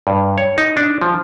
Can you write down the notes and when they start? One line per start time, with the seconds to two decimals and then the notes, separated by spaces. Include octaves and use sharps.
0.07 G2
0.38 C#5
0.58 D#4
0.77 D4
1.02 F3